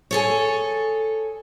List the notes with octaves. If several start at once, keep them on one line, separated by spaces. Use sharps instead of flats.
G#4 A4 C#5